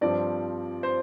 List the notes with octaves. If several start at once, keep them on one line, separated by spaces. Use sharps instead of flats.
G2 F3 C4 D5
C5